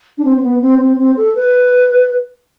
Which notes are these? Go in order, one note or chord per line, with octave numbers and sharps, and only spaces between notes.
D4
C4
C4
B3
C4
C4
C4
A4
B4